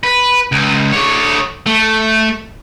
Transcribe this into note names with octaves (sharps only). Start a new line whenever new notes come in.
B4
C#2
D3 C#5
A3